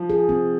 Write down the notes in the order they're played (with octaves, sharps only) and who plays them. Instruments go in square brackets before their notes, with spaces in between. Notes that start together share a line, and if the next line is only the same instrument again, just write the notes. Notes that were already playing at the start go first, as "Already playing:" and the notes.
Already playing: [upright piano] F3
[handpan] G#4
C4